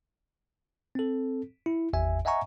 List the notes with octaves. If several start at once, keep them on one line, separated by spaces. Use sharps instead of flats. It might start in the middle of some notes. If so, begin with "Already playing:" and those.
C4 A4
E4
G#1 E2 E5 G#5
D#5 E5 F#5 G#5 A#5 C#6